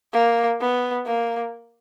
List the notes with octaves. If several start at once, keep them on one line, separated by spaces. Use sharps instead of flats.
A#3
B3
A#3